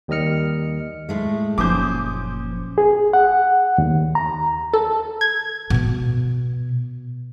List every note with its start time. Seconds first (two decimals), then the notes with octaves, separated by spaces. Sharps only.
0.08 D#2 D#3 G3 D#5 F6 C#7
1.09 A2 G#3 A3
1.58 F#1 A#2 F3 C#4 C5 D6 D#6 G6
2.78 G#4
3.13 F#5
3.78 D#2
4.15 A#5
4.73 A4
5.21 G#6
5.70 B2 B3